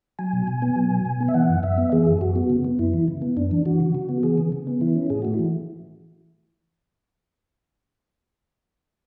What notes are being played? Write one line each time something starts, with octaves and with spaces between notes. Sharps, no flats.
F#3 G#5
B2
B2
B3
F#3
B2
B2
B3
E5
E3 F#5
F#2
F#2 E5
B3
E3 G#4
F#2
F#2 F#4
B3
C#3
B3
F#2 E4
E3
C#3
B3
F#2 D4
E3
E3 F#4
C#3
C#3
B3
E3 G#4
C#3
C#3
B3
E3 E4
C#4
A2 G#4
A3 F#4
E4
E3